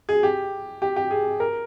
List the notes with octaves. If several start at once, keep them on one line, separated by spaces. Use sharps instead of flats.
G#4
G4
G4
G4
G#4
A#4